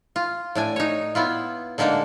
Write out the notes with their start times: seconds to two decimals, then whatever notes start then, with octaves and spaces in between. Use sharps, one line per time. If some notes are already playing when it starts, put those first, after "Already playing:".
0.16 F4
0.55 A2 D4 G#5
0.76 D#4 C#5
1.15 B3 E4 F4
1.78 D3 G#3 A#3 D4 D#4